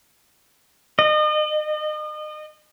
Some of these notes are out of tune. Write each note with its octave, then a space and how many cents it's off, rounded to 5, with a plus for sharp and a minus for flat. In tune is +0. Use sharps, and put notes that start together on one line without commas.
D#5 -35